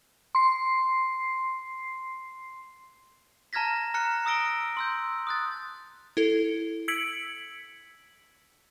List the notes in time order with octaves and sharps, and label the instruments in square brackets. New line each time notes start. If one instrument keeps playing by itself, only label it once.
[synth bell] C6 C7
[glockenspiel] A5 A#5 F6 G#6 A#6 B6
A#5 F6 F#6 C#7
A#5 D#6 E6 A#6 D7 G7
C6 E6 G6
D#6 F#6 A6
[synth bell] E4 A4
E6 G#6 B6 C#7 D7 F#7